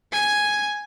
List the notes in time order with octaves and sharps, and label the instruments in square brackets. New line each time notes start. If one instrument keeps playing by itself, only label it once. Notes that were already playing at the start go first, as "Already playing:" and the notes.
[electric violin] G#5